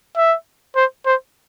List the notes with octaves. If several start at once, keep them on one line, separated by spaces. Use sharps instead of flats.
E5
C5
C5